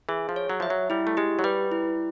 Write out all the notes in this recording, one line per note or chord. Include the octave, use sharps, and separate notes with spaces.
E3 G#4
F3
C#5
F#3
F3 E5
F#3
G3 E4
A3
G#3 G4
F#3
G3 B4
E4